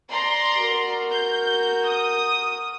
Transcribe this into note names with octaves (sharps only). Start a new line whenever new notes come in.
D5 A#5 C6
F#4 A#4
G6
D#6